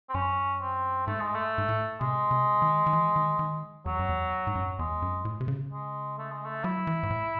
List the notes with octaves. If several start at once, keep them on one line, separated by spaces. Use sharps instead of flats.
C4
F#2 C#4
C4
G#2 A3
G#3
A3
G#2
A2
C3 G#3
C3
D#3
D#3
E3
D#3
D#3
E2 F#3
F#2
E2
G#2
F#2
E2 G#3
F#2
A2
C3
C#3
G#3
A3
G#3
A3
F#3 E4
E3
G#2
A2